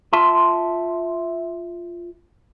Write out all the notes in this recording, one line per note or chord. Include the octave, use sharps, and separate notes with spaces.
F4 E5 A5 C6